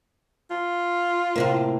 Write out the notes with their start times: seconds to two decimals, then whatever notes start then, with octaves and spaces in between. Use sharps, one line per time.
0.51 F4
1.36 A2 C3 A#3